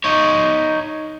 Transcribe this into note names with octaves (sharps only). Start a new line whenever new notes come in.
D#4 C#5